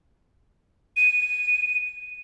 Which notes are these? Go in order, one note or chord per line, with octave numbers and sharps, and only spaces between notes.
D#7